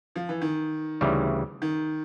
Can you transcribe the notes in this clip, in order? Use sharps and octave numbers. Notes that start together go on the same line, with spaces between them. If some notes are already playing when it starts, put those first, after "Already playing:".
F3
E3
D#3
D2 C#3 E3 G3
D#3